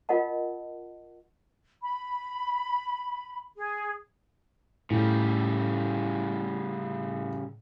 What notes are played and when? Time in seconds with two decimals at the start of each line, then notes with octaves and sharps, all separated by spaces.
0.09 F4 A#4 D#5 F#5 A5
1.83 B5
3.57 G#4
4.90 A2 C#3 G3